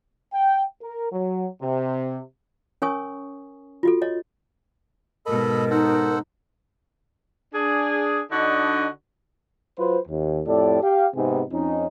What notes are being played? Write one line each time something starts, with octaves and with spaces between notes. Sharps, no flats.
G5
A#4
F#3
C3
C#4 A#4 C#5 G#5 C#6 D#6
F4 F#4 A4
C#5 D#5
G#2 B2 A4 A#4 D#5 B5
D#4 A4 C5 F#5
D4 G#4
D3 D4 D#4 F#4 D#5
F#3 F4 B4 C5
D#2
F2 A2 G4 A4 D5
G4 F5 G5
G#2 C3 B3 C4 D#4 G#4
F2 C#4 D#4